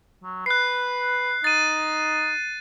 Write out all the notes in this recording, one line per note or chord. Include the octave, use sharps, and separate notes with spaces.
F#3
B4 F#6 C7
D#4 A6 D#7